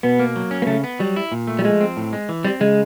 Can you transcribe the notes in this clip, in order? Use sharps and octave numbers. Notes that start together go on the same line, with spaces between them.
B2 B3
A#3
F#3
C#4
A#3
C#3 A3
B3
F#3 G3
E4
A#2
A3
G3
F3 G#3
C4
A2
G#3
E3
G3 C4
C#3 G#3